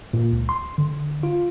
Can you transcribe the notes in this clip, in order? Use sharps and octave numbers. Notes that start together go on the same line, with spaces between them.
A#2
C#2
C6
D3
F4